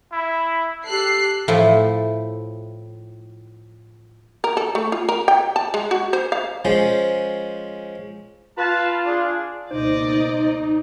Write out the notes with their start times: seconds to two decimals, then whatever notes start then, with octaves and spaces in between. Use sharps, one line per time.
0.13 E4
0.86 G4 A4 F#6 C7
1.48 A2 F3 E4
4.44 A#4
4.57 A4
4.75 A3
4.92 F4
5.09 A#4
5.28 G5
5.56 A5
5.74 G#3
5.91 F#4
6.13 C5
6.32 F5
6.65 F3 G#3 C#4 C5
8.58 F4 B4 F5 A5
9.06 D4 G#4
9.71 C#2 B2 A#3 D#4 C5 D5 D#5